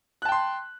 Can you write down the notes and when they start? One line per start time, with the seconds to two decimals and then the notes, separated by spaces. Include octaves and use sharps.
0.22 F#6
0.25 A5
0.29 G5
0.32 C6